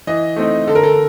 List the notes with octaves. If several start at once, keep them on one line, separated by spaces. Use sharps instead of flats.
E3 D#5
A3 C4 D#4
D3 A4
A#4
A4